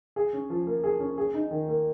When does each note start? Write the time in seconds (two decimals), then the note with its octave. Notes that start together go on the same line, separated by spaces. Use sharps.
0.16 G#4
0.33 C#4
0.50 F3
0.67 A#3
0.84 G#4
1.00 C#4
1.18 G#4
1.34 D#4
1.51 D#3
1.69 A#3